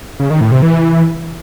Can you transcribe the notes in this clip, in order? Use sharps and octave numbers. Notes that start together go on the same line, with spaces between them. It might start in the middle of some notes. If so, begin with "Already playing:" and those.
C#3
D#3
A2
C3
E3